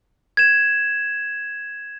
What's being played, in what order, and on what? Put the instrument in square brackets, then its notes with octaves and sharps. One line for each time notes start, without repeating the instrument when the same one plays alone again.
[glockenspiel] G#6 E7